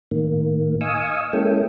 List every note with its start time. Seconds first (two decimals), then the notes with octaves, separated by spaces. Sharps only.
0.11 A2 D#3 A#3
0.81 D#5 F5 G#5 C#6 D#6 E6
1.33 G#3 A#3 C#4 E4 A4 G5